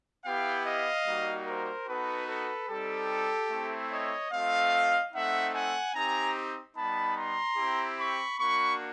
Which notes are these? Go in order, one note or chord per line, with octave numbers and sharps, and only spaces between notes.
B3 E4 G4 F5 G5
D#5 F5
G3 A#3 D#4 F#4
A#4 C5
B3 D#4 F#4 A4 B4
A4 B4
G3 C4 D#4 G4 A4
A3 C4 E4
C#5 D#5
A3 C4 F4 D#5 F5
A3 C4 D#4 E5 F#5
F#5 G#5
C4 D#4 G4 G#5 A#5
G3 B3 D#4 A5 B5
A#5 C6
C4 E4 G4
B5 C#6
A#3 D4 F#4 B5 C#6